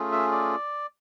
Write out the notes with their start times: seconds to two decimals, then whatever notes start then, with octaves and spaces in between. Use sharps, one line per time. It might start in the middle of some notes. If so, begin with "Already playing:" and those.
Already playing: A3 C#4 F4 G#4
0.12 E5
0.32 D5